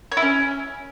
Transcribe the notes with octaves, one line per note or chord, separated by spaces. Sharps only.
C#5
E4
C#4